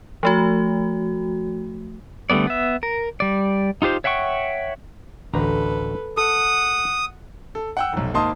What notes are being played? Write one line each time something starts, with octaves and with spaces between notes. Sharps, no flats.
F3 A3 F#4
D3 G3 A3 B3 D5
B3 E5
A#4
G3 D5
D#4 F4 G4 C5
C#5 E5 F#5 G5 C#6
A1 D2 A4 B4 A#5
A4 F#5 D#6
A4
F#5 G5 E6
F1 B1
G#1 A#3 D#4 A5 C6 D#6